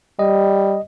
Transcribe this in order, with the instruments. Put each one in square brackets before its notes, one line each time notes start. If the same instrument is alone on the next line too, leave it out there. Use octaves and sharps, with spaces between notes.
[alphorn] G3 [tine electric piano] D#5